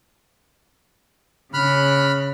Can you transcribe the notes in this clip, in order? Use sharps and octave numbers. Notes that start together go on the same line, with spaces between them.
C#3 B5 F6 F#6